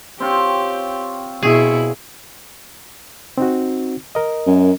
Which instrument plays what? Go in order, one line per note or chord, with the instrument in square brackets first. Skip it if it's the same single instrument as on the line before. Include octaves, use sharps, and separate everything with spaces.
[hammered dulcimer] C4 F4 C#5 [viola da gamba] G4
[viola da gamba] B2 E4 [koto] G#4
[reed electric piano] C4 D#4 F#4
A#4 D#5
[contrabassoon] F#2